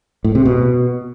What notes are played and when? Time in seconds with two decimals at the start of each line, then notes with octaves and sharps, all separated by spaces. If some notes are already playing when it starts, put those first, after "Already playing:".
0.24 A2
0.35 C3
0.45 B2